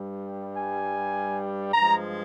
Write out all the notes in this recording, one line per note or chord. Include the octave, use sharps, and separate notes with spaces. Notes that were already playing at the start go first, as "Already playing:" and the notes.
Already playing: G2 G3
G#5
G2 F3 G#3 A#5